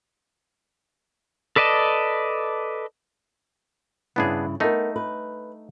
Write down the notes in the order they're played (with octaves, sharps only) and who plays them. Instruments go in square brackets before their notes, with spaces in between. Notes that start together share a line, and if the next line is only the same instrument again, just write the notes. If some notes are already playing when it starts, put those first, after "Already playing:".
[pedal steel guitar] A4 B4 D5 D#5 A5
[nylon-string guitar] G2 C#3 E4 [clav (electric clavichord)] B3 D4 G#4
[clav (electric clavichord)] A3 D#4 [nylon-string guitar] B3 A#4
[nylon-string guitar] B4